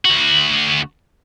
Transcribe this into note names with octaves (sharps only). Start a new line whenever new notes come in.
D2 F#4